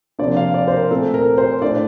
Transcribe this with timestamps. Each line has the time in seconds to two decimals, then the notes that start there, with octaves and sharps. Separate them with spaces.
0.19 C3 F3 A#3 D4 D5
0.37 F5
0.54 D5
0.68 C5
0.72 A#4
0.91 A#2 A3 C4 A4
1.14 A#4
1.38 C5
1.61 A2 A3 D4 D5